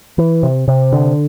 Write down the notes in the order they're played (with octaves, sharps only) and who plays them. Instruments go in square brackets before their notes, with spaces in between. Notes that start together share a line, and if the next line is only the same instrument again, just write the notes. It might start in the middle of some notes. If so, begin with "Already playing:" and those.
[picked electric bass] E3
C3
C3
D3